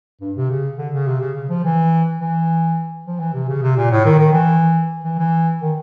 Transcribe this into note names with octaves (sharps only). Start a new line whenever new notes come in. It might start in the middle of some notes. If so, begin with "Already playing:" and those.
G2
C3
C#3
D3
C#3
C3
C#3
C#3
F3
E3
E3
F3
E3
C3
C#3
C3
A#2
A2
D#3
D#3
E3
E3
E3
D#3